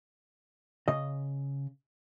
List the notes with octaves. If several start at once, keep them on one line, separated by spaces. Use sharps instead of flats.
C#3 D#5